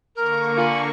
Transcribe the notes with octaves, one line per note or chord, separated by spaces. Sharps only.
D3 A#3 A#4 C#6
F4 F#5 G#5 B5